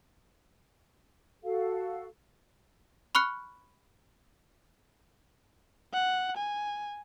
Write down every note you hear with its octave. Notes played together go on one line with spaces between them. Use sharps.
F#4 A4 F5
B5 C#6 F6 F#6 C#7
F#5
G#5